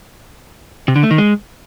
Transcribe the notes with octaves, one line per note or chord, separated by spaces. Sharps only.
C3
D3
A3
D#3
G#3